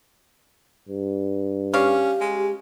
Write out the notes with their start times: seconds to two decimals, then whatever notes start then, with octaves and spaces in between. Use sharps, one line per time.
0.89 G2
1.74 C#4 G4 C#5 D5 F5
2.21 G#3